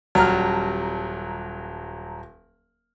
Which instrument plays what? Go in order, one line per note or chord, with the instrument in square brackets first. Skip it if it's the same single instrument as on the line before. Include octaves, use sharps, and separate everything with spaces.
[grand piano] D#1 G3 F6 [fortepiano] F#3 [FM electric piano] A5 A#5